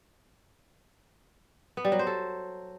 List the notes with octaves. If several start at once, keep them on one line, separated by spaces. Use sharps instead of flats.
B3
G3
F#3
C5
A4